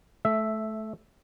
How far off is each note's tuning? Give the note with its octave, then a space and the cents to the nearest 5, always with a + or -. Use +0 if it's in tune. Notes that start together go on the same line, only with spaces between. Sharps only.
A3 -20 E5 +0